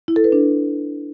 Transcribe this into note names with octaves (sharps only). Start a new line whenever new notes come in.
E4
A4
B4
D4